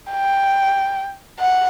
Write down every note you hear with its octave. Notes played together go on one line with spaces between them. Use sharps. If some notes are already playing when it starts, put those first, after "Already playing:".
G5
F#5